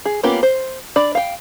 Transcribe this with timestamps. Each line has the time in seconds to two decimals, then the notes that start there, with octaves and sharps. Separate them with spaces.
0.05 G#4
0.23 A#3 B3 C#4 F4 G4
0.43 C5
0.96 D4 D5 B5
1.15 F5 G5